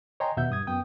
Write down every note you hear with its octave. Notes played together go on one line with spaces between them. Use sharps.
C#5 D#5 G5 G#5 A#5 C6
D#2 B2 E5 F#5 G6
G2 D#6 G#6
F#2 B3 G5 D#6